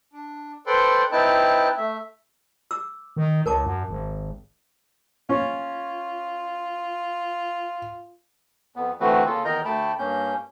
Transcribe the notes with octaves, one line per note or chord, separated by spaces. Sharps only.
D4
A4 B4 C5 D5 G5 C6
C4 D#4 E4 B4 G5 A5
A3 E5
D6 E6
D#3
C#2 A#4 A5 D6
F#2
G#1
C#4 F4
F2 B3
D3 E3 A3 C4 F#4 B4
C#3 A#3 F4 A4
E2 D#3 A#4 D#5 A#5 G6
D2 A3 G5 A5 B5
G2 A#3 C#4 G6